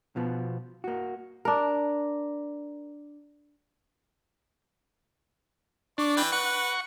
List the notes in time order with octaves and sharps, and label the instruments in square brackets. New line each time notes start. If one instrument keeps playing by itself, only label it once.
[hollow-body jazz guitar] B2 F3 B3
A#3 F#4
[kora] D4 A#4
[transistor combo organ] D4 [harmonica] D5 C#6
[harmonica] E3 B4 G5
[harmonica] B4 [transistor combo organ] F#5 C#6